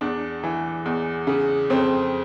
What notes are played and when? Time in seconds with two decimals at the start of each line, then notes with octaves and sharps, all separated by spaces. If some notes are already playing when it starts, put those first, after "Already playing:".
0.01 E2 D4
0.44 E3
0.86 E2
1.27 C#3
1.70 F2 C4